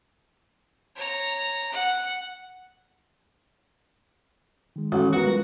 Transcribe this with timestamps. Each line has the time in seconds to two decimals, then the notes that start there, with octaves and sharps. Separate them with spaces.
0.96 C#5 A#5
1.72 F#5
4.76 D#3 G#3
4.92 A1 F#4
5.13 B3 F#4 A#4 F#5
5.27 G3 G#3 F4